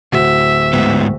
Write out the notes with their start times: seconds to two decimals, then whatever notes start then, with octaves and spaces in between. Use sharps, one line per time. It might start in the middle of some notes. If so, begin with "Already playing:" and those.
0.12 D1 F#4 E5
0.73 G#2 B3